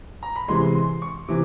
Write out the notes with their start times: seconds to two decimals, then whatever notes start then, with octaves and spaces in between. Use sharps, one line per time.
0.23 A#5
0.36 B5
0.48 C3 E3 G#3 C6
0.75 C6
1.02 C#6
1.28 C3 E3 D6